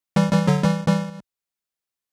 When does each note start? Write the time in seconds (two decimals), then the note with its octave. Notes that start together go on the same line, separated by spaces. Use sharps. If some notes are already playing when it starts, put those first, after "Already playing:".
0.16 E3 G3
0.32 E3 G3
0.47 D3 F#3
0.63 E3 G3
0.88 E3 G3